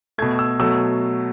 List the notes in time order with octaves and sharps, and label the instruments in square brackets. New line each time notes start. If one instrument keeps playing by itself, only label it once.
[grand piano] B2 A3 G#6
E6
B2 F#3 A3 E6